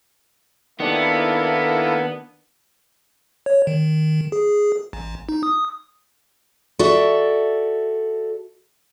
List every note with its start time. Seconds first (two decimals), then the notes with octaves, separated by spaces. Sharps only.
0.80 D#3 A#3 B3 D4 E4 G4 A4
3.46 C#5
3.67 D#3
4.32 G#4
4.93 A1
5.29 D#4
5.43 D#6
6.79 F#4 A4 D5 E5